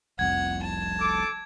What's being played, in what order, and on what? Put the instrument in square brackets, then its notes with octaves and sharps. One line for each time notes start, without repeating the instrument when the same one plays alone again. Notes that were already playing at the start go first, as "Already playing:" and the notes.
[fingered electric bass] F1 C2 F2 [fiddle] F#5 [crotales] G#6
[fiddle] A5
[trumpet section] A4 D6